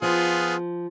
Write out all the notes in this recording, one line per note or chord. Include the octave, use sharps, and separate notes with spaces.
F3 B3 F4 G#4